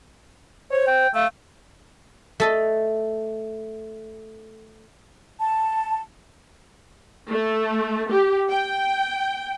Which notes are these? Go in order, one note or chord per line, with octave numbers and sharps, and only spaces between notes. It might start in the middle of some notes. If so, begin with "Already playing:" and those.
C5 C#5
G5
A3 F5
A3 A4 D#5
A5
A3
G4
G5